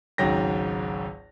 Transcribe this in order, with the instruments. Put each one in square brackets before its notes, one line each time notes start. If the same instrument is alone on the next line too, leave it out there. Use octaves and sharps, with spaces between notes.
[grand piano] G#1 C#2 G#2 F#3 G5 A#6